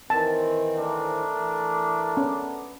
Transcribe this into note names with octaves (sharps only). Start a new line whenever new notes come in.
D#3 E3 C4 A5
A3 D4 A#4
E3
B3 C#4